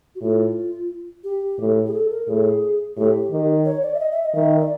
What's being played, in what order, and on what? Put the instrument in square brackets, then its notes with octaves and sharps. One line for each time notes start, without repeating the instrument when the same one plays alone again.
[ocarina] F#4
[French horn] A2 [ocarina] F4
[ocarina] G4
[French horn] A2
[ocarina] G#4
A4
A#4
[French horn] A2 [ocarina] G#4
[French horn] A2 [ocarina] G4
[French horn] D#3
[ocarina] C#5
D5
E5
D#5
E5
D#5
[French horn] D#3 [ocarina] E5
[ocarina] D5